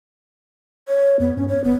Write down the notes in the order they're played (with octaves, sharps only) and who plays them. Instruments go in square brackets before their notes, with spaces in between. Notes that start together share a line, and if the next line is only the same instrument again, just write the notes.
[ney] C#5
[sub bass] F2 [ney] B3
[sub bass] G2 [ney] C#4
[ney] C#5
[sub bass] G1 [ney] B3